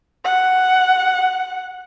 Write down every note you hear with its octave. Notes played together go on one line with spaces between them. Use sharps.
F#5